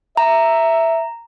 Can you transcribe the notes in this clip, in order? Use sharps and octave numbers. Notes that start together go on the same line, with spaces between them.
E5 A#5